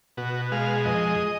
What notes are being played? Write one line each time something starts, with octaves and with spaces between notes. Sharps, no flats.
B2 F#4
G#3 F5
F2 D#5